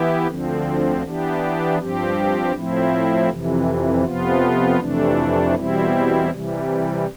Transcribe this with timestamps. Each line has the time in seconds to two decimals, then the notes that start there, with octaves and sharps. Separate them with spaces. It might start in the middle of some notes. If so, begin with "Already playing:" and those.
Already playing: E3 B3 E4 G4
0.27 D2 D3 F3 C4
1.03 E3 B3 D4 G4
1.79 G2 F3 C4 G4
2.54 A2 F3 C4 E4
3.29 F2 C3 E3
4.05 F2 C3 F3 B3 F4
4.79 F2 C3 E3 A3 D4
5.55 E2 B2 G3 C4 E4
6.31 C3 E3 G3